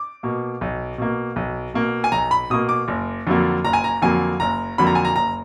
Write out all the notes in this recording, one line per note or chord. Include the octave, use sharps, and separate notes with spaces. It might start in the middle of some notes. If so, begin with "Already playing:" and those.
Already playing: D6
B2 A#3
B1
B2 A#3
B1
B2 A#3
G#5
B1 A#5
B5
B2 A#3 D#6
D6
F#1
F2 D3 F#3 A#3
F#1 A#5
G#5
A#5
F2 D3 F#3 A#3 G#5
F#1 A#5
F2 D3 F#3 A#3 B5
A#5
G#5
A#5
F#1 A#5